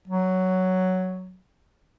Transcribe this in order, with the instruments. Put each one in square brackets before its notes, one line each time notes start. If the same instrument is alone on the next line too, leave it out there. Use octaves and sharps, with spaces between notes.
[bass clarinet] F#3